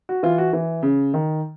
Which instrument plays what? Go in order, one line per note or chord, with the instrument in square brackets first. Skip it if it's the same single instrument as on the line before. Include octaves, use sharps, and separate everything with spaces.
[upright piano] F#4
E3 F4
F#4
E3
C#3
D#3